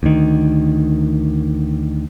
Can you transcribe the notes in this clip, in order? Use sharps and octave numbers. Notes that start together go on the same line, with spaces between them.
D2 D#3